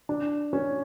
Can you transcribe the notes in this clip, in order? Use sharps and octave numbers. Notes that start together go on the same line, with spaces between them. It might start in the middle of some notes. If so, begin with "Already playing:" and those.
D4
C#4